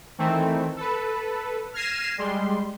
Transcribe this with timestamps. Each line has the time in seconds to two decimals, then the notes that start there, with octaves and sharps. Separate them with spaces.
0.18 D#3 E3 A3 C4
0.76 A4 B4
1.74 F6 G#6 A#6 C7 D#7 E7
2.18 G3 G#3 C6